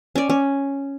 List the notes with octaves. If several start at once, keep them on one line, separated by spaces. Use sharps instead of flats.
C#4 D5
C#4